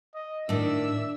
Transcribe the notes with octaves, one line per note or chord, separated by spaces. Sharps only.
D#5
A2 D#3 D4 E5 E6